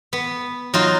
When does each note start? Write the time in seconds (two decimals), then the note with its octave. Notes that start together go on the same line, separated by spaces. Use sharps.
0.13 B3
0.74 F#3 D#4 F4